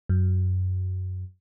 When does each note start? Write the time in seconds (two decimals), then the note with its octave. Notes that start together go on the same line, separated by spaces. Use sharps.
0.09 F#2